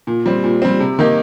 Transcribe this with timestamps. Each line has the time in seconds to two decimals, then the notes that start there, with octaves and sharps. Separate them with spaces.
0.07 A#2
0.26 G3 C4
0.44 A#2
0.62 G3 C4
0.80 C3
0.99 D#3 A#3 D#4 G4